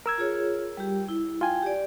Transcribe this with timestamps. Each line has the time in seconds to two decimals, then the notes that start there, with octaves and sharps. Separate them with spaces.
0.06 A#4 E6 G#6
0.18 F4 G#4 C#5
0.77 G3 G4
1.08 E4
1.41 F4 G5 G#5
1.63 G4 D5